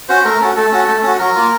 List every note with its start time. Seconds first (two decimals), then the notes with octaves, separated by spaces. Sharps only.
0.09 C#4 F#4 C5
0.25 A3 A#4
0.41 C#4 F#4 A4
0.56 A3 A4
0.72 C#4 F#4
0.88 A3
1.03 C#4 F#4
1.19 F#3 A#4
1.35 A#3 F4